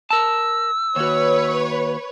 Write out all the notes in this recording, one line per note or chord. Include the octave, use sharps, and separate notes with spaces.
A#4 A5 E6
D#2 F#4 B4 C#5